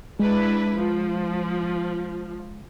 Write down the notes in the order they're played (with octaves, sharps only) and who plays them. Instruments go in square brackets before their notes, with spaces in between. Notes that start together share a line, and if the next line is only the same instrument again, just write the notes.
[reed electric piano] G#3 [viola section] D4 E4 B4
[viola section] F3